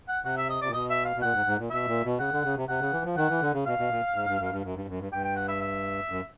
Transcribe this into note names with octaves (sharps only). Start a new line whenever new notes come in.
F#5
C3 F#5
E5
D#5
D5
A#2
B2 D#5
E5
F5
B2
A#2 F#5
G#2
G#2
A#2
B2 E5
A#2
B2
C#3 F#5
D3
C#3
C3
C3 F#5
C#3
E3
F3
D#3 F#5
E3
D3
C#3
B2 F5
B2
A#2
G#2
G2
F#2
G2
F#2
G2
F#2
G2
G2 G5
G5
F#5
E5
E5
F#2